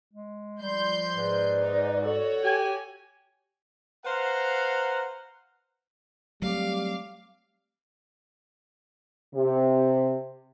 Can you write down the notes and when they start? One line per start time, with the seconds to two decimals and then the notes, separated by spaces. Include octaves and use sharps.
0.13 G#3
0.61 F3 G3 C6 G6
1.16 G#2 B4 D5
1.60 D#4
2.03 F#4 A4 C#5
2.43 G4 G#5
4.05 B4 C5 F5 F#5 A#5
6.42 F#3 G3 A3 C4 F5 D6
9.34 C3